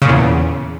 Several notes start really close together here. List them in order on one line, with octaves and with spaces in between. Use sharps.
C#3 A#2 E2